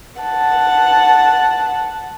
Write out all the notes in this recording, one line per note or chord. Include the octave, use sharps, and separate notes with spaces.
F#5 A5